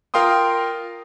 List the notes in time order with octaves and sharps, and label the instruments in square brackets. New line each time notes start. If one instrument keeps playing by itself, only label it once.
[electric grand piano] F4 A#4 F5 G5 C6 D#6